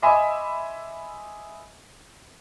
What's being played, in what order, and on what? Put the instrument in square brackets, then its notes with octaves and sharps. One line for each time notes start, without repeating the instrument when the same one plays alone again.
[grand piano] D#5 E5 G#5 B5 C6 D6